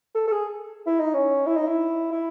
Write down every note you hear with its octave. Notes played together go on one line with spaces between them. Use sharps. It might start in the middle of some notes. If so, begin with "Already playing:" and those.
A4
A4
G#4
E4
D#4
C#4
E4
D#4
E4
E4